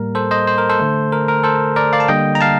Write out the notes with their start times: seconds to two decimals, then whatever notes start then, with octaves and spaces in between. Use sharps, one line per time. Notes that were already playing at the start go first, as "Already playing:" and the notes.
Already playing: A2 G3 A#3 A#4
0.15 A4 C5
0.31 C5 D#5
0.47 C5
0.58 A#4
0.69 A4 C5
0.80 D3 A3
1.12 A#4
1.28 A#4
1.44 A4 C5
1.76 A#4 D5
1.93 D5 F5
2.00 A5
2.08 D3 G3 A#3 D#5 G5
2.35 A#5
2.41 F5 A5